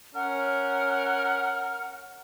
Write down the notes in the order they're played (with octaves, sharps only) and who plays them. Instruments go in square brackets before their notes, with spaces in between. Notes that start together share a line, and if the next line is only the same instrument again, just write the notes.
[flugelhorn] C#4 [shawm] A#4 [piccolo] F#5